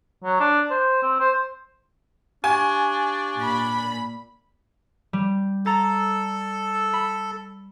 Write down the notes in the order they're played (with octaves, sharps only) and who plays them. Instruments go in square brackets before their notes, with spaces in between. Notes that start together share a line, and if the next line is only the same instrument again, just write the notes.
[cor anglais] F#3
D4
C5
C4
C5
[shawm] D4 [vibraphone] G4 F5 C#6 [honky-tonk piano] G#5
[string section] A#2 B5
[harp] G3
[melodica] A4 [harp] A#5 A6
[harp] B5